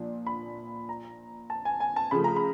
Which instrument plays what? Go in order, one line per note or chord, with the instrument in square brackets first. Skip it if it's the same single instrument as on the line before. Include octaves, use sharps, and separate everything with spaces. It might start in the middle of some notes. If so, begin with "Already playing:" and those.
Already playing: [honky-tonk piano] A#2 F3 D4
[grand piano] B5
A#5
A5
G#5
G#5
A5
[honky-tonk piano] C#3 F3 A3 [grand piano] B5
[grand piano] A#5
B5